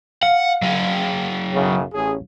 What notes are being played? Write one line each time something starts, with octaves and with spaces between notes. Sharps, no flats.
F5 F#5
F#3 G#4
B1 F#2 C#3
A1 C#4 G#4